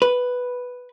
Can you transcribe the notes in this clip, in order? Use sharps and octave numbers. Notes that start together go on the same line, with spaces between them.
B4